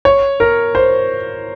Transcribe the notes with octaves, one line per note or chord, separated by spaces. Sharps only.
C#5
A#4
C5